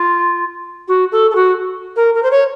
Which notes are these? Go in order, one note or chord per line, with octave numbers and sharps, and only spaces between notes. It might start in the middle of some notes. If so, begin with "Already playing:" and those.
Already playing: F4
F#4
A4
A4
F#4
A#4
A#4
C5
C#5